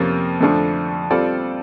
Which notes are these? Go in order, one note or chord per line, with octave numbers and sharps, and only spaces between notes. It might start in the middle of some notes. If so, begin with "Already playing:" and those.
Already playing: F2 C3 F3 A#3 C#4
F2 D3 F3 A3 D4
G3 C4 F4 A4 D5